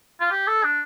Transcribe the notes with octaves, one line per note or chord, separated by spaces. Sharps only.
F4
G4
A4
D4